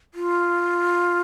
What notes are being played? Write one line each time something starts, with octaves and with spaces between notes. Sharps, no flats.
F4